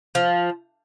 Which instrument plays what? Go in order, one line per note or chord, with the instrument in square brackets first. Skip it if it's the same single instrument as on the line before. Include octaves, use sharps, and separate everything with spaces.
[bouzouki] F3